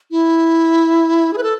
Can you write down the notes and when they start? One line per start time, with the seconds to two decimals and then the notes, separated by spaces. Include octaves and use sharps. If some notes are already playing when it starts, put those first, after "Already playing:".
0.11 E4
1.33 G#4
1.38 B4
1.43 A4